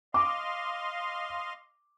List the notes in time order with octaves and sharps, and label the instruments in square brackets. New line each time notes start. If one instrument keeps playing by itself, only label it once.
[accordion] D#5 F5 C6 [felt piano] D6